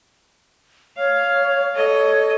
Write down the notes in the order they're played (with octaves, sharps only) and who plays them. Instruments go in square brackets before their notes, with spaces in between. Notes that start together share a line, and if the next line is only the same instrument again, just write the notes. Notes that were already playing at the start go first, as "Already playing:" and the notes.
[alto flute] C#5 [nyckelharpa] F5
[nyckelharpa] A4 D#5 [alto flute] C#5